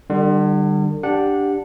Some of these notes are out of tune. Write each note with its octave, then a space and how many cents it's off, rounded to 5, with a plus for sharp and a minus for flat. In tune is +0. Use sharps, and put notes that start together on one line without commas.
D3 +40 G3 +0
D4 +0 G4 +0 F#5 -15